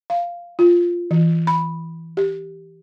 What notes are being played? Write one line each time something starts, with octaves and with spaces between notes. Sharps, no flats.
F5
F4
E3
B5
G4